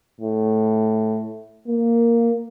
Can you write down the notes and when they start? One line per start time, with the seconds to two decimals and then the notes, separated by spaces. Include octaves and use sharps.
0.21 A2
1.68 A#3